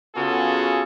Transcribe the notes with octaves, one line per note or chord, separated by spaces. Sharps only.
C#3 B3 F4 F#4 G#4 A4